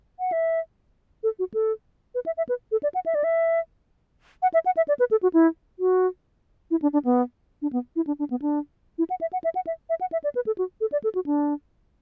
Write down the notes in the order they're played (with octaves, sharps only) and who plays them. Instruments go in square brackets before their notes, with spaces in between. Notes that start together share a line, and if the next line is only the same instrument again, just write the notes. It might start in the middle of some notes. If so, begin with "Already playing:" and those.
[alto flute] F#5
E5
A4
F#4
A4
B4
E5
E5
B4
A4
D5
F#5
E5
D5
E5
F#5
E5
F#5
E5
D5
B4
A4
F#4
E4
F#4
E4
D4
D4
B3
D4
B3
E4
D4
D4
B3
D4
E4
F#5
E5
F#5
E5
F#5
E5
E5
F#5
E5
D5
B4
A4
F#4
A4
D5
A4
F#4
D4